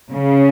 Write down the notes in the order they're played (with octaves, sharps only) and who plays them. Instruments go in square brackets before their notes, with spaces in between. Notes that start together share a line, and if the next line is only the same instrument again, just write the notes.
[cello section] C#3